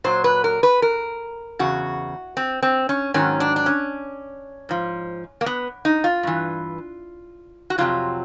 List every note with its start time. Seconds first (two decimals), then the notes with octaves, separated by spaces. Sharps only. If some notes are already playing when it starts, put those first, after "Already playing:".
0.04 A#2 F#3 C5
0.24 B4
0.44 A#4
0.63 B4
0.82 A#4
1.59 E2 C#3 F#4
2.37 C4
2.63 C4
2.89 C#4
3.14 G#2 D#3 F#3 C#4
3.40 D4
3.56 D4
3.66 C#4
4.69 G#2 F3
5.41 A#3
5.46 B3
5.85 D#4
6.04 F4
6.23 G2 E3
7.70 F#4
7.78 F2 C3 D#3 F#3 F4